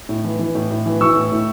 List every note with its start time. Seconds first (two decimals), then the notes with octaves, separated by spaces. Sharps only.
0.09 A2
0.24 E3
0.39 E3
0.55 A2
0.70 A2
0.86 E3
1.01 E3 C#6 E6
1.16 A2
1.32 A2